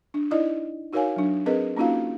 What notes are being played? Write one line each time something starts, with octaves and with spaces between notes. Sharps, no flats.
D4
D#4 E4 D5 D#5
D#4 F#4 A#4 C#5 F5 G#5
F#3 D4
C4 G#4 A#4 B4 D#5
A#3 C#4 D#4 F4 F#4 F5